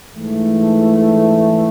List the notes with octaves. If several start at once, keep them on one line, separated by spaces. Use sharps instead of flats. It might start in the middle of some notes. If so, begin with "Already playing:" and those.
G#2 E3 A3